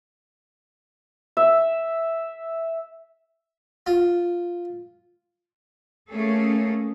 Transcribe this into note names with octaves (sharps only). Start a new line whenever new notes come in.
E5
F4
A3 A#3 C#4 G#4 A4